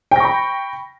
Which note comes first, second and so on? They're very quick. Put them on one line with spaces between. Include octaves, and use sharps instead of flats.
G5 A#6 C#6 B5